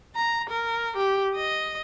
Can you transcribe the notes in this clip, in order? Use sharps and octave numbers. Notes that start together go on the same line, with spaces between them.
A#5
A#4
G4
D#5